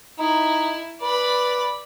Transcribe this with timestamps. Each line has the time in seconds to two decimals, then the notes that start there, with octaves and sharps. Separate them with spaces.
0.19 D#4 E4
1.02 B4 D5 B5